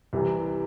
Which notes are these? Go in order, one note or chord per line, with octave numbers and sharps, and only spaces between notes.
C2 C3 E3